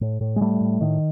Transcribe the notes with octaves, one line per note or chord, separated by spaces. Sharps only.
A2
A2
G#3
A2 G3 A3
A2
A2 D#3